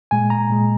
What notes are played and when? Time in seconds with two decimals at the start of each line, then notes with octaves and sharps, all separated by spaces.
0.11 A#2 G#3 G#5
0.30 A#5
0.49 A#2 G#3